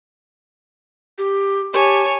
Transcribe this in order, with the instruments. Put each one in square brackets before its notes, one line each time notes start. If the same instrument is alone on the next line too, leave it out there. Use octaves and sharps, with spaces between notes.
[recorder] G4
[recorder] G4 [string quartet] C#5 G#5 A5